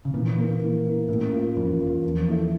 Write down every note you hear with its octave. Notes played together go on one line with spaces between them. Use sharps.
C#3
A#2 E3
A#3 E4 A#4
E3
A#3 E4 A#4
A2 C#4
F4 A#4
F2 C#4
E2
F4 A#4
E2
F3
A#3 E4 A4 E5